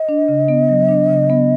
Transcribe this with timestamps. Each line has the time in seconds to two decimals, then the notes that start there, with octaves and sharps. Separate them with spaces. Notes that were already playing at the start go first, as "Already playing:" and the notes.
Already playing: D#5
0.09 D4
0.28 C#3
0.48 B3
0.69 F#3
0.89 D4
1.09 C#3
1.30 B3